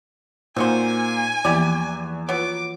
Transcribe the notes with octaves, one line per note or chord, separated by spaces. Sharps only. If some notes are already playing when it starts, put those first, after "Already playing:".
A#2 A#3 C4 D#4 F#4 C5 G#5
E2 E3 F3 A#3 E4 G4 D5
F#3 B3 F4 B4 C#5 D6